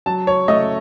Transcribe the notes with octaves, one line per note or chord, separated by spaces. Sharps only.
F#3 A5
C#5
A3 D#5